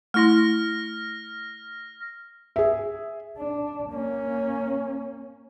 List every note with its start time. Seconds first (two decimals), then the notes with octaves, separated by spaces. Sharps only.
0.14 A3 E4 C6 F6 A#6
2.56 G#4 E5
3.38 D4
3.89 A#3 C#4